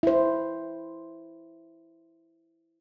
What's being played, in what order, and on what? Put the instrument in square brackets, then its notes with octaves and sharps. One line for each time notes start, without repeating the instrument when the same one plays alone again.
[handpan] E4 C5